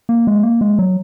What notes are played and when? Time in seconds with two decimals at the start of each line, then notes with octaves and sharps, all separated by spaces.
0.09 A#3
0.27 G#3
0.43 A#3
0.61 G#3
0.79 F#3